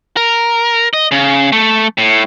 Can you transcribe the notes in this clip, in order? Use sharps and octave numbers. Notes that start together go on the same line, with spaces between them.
A#4
D#5
C#3
A3
A2